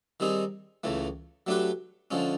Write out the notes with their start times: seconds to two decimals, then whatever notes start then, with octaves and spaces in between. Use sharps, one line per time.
0.20 D#3 G3 C4 D#4 G#4
0.84 C#2 C#3 E3 A3
1.47 F#3 A3 D4 G4 B4
2.11 D3 F3 G#3 C#4